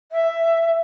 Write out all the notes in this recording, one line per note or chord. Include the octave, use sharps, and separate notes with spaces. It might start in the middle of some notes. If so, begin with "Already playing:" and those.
E5